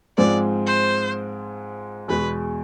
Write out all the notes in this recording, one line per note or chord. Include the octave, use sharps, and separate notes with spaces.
G#2 F3 G#3 C4 D5
C5
E2 B2 G#3 B4